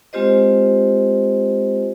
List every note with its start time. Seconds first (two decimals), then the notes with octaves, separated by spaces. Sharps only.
0.13 G#3 C4 F4 G4 C5 D#5